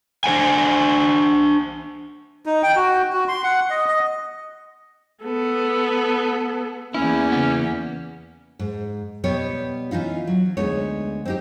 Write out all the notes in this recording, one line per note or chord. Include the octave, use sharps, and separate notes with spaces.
D4 C5 F#5 G#5
D#4
G5
F#4
F#4
C6
F#5
D#5
D#5
B3 A4
E2 A#3 C#4 E4
C#3 B3
G#2
B2 G3 B3 G4 C#5
E3 C#4 D#4 F4
F#3
D2 G#3 B3 D#4 C#5
C4 D#4 G4